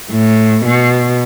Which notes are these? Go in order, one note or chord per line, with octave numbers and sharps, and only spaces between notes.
A2
B2